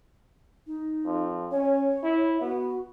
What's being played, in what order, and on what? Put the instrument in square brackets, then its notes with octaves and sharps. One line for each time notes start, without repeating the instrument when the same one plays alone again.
[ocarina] D#4
[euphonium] F2
[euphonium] C#4 [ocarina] C#5
[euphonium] E4
[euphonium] B3 [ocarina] F#4